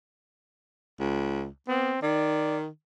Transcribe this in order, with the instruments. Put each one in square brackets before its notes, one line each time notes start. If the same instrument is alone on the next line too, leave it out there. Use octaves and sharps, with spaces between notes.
[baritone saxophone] C#2
[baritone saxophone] B3 [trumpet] C4
[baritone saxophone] D#3 [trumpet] D5